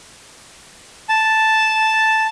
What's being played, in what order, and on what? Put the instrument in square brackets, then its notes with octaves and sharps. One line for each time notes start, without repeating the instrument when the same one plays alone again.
[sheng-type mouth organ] A5